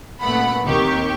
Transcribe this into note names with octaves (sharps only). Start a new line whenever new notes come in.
F#2 A#2 A3 B3 F#5 B5
D#2 D#3 C4 G4 C#6